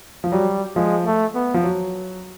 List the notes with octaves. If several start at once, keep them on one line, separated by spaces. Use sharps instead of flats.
F3
F#3 G3
F3 G#3
A3
B3
F3
F#3